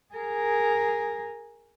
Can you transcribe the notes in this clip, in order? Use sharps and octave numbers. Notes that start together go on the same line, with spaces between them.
G#4 A#4